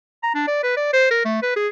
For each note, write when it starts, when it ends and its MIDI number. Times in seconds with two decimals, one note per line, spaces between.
0.23 0.30 82
0.34 0.45 62
0.47 0.60 74
0.63 0.74 71
0.76 0.91 74
0.93 1.07 72
1.10 1.23 70
1.25 1.41 57
1.42 1.55 71
1.56 1.68 68